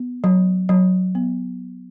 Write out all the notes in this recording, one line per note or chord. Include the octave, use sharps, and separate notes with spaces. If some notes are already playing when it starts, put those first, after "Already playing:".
Already playing: B3
F#3
F#3
B3